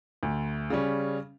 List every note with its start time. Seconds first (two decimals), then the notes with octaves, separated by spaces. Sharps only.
0.23 D2
0.70 C#3 G3 C#4